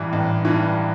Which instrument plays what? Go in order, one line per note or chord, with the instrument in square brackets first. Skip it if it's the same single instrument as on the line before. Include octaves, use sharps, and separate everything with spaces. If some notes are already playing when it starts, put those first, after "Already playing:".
Already playing: [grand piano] A1 G2 E3
A1
G2 E3